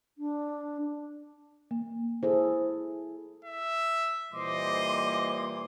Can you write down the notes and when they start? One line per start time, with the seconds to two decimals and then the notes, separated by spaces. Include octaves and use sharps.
0.18 D4
1.71 A#3
2.23 E4 G#4 A4 C5
3.45 E5
4.33 A#2 E3 G3 C5 D#5 C6 D6